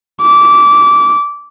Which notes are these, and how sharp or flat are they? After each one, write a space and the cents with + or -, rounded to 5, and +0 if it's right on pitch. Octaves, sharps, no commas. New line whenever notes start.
D6 -20